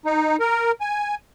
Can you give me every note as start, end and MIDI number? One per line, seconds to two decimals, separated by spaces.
0.05 0.36 63
0.40 0.72 70
0.81 1.15 80